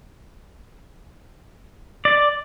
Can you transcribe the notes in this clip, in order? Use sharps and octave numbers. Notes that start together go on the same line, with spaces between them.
D5